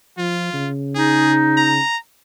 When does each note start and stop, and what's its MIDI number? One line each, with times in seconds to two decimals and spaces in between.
0.18 0.50 53
0.18 0.69 65
0.54 1.79 49
0.95 1.79 63
0.95 1.35 68
1.57 1.97 82